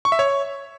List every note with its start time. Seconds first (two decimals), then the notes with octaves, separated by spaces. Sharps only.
0.05 C#6
0.12 E5
0.19 C#5